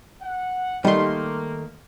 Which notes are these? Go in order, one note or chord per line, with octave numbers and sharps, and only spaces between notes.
F#5
D#3 G3 A3 A#3 C6